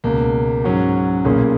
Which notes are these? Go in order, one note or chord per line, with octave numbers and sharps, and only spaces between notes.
C#2 B2 A#3
G#2 F#3 C#4 F#4
B1 A#2 A#3 C#4 G#4